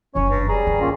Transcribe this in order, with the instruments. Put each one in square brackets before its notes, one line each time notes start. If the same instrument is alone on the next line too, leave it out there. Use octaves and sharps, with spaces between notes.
[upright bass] F#1 E3 [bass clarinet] C#4 [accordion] C#5
[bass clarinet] G2
[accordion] G3 A#5 [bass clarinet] G#4
[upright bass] G2 D#3
[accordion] A#3 C#4 F4